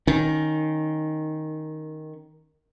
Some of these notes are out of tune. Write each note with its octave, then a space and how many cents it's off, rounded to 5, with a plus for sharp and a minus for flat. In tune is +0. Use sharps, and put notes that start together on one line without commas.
D#3 +0 C#4 +0